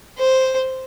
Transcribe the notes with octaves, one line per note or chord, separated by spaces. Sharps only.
C5